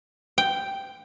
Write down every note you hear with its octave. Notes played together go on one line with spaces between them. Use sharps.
G5